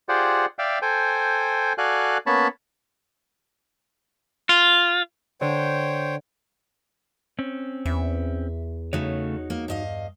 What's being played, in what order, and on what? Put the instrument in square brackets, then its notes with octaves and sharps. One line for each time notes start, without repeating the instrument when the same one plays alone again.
[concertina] F4 G4 G#4 C5 D5 F#5
D5 E5 F5 G5
A4 C5 G5 G#5
F#4 A4 D5 F5 G#5 F#6
A#3 B3 C#4 C#5 A5 B5
[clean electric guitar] F4
[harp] D3 [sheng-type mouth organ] C5 C#5 G5
[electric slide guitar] C4 C#4
[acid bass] E2 [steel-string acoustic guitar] E5
[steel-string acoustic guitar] C#3 A3 [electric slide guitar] D#4 F#4 C#5
[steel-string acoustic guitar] A#3
G2 D#5 F5